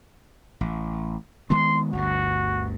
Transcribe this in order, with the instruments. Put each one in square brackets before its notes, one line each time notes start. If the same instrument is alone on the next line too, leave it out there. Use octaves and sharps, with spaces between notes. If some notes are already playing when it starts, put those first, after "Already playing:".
[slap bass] A1
[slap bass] D#3 G#3 B3 [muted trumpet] C6
[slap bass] G1 D2 G2 [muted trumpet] F#4